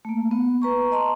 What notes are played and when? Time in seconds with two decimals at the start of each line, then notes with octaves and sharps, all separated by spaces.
0.05 A3 A#3
0.31 B3
0.62 B4 A#5 C#6
0.92 D#5 A5 A#5 C6